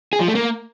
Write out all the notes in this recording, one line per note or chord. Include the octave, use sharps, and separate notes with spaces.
G#4
F3
A3
A#3